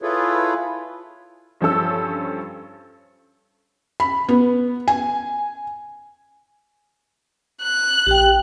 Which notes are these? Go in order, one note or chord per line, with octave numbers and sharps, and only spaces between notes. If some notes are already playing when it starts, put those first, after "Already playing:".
E4 F4 G#4 A4 B4 C#5
G2 F3 C#4 A4 E6
B5
B3
G#5
F#6
A#1 G4 G5